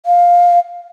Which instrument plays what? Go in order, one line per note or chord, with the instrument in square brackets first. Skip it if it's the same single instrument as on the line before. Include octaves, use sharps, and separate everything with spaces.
[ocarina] F5